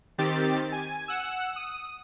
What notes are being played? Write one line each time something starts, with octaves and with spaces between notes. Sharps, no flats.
D#3 C4 G4 A6
G#5
F#5 E6
D#6